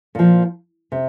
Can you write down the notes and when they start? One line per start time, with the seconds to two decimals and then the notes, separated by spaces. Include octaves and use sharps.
0.15 A#2 F3
0.92 C3